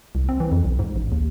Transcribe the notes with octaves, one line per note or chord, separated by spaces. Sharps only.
C2
C4
E3
F2
B1
G#2
A1
D#2